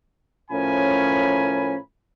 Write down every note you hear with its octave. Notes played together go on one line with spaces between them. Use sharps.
A2 F3 C#4 A#4 G#5 B5